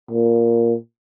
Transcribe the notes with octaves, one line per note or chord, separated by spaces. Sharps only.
A#2